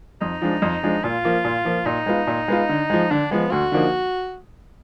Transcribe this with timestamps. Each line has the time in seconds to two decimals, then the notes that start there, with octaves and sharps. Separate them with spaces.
0.21 F2 D#4
0.42 F3 G#3 D4
0.62 F2
0.83 F3 G#3 D4
1.03 A#2 F4
1.25 F3 A#3
1.45 A#2
1.65 F3 A#3
1.86 A#2 D#4
2.06 G#3 B3 F4
2.27 A#2
2.48 G#3 B3 F4
2.69 D3
2.90 F3 G#3
3.11 D3 D4
3.31 F3 G#3 B3
3.51 D2 F#4
3.72 D3 F3 A#3 D#4